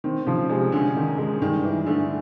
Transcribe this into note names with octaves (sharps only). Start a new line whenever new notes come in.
D#3 C4
C#3 F3
C3 G#3
D3 C#4
D#3
G#3
G2 D#3
E3
D3 A3